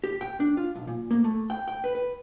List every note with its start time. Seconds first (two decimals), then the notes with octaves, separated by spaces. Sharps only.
0.04 G4
0.21 G5
0.40 D4
0.57 F4
0.75 B1
0.87 A#2
1.11 A#3
1.24 A3
1.50 G5
1.68 G5
1.84 B4
1.95 B4